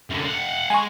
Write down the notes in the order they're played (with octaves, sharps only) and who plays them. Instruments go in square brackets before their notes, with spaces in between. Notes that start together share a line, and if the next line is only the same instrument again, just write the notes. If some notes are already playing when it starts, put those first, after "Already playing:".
[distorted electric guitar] F#2 D3
F5 F#5
[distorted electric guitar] G#3 [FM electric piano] G#5 C#6